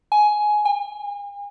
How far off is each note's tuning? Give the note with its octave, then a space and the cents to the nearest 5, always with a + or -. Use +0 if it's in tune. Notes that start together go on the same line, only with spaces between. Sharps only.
G#5 +15
G#5 -40